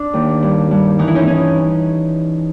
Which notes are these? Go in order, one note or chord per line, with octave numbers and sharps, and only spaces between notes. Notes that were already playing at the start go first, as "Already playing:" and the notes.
Already playing: D4
D#2
G2
G2
E3 D#4
E4
C#4 D#4
C#4